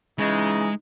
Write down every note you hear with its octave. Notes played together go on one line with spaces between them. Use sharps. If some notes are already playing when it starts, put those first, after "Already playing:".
C#3 E3 G#3 D#4